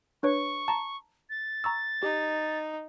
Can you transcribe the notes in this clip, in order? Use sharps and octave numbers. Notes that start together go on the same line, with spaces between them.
D4 B4 C#5 C#6
A5 A#5
A6
A#5 C#6 E6
D#4 G4